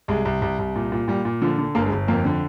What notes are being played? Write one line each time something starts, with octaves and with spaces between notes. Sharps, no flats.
C2 G#3
C2
C2
C2
A#2
A#2
A#2 G3
A#2
D3 F3
D3
G1 A#3
G#3
G1
F2 A#3
D3